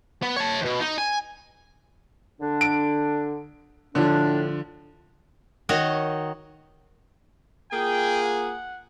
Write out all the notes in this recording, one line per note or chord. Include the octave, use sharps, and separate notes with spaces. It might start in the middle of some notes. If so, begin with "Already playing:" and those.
B3
C#5 A5
D#2 B2
D#4
G#5
D3 D4
D7
A2 D3 F3 D4
D#3 D#4 F#4 C#5 D#5
A#3 F4 G#4 G5
F#5